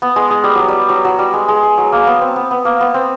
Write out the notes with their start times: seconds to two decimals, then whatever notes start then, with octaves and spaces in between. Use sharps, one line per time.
0.02 B3
0.16 G#3
0.30 G#3
0.44 G3
0.55 F#3
0.68 G3
0.89 F#3
1.04 F#3
1.19 G3
1.33 G#3
1.48 G#3
1.63 G#3
1.78 F#3
1.92 A#3
2.07 B3
2.21 C4
2.36 B3
2.51 B3
2.65 A#3
2.80 B3
2.94 C4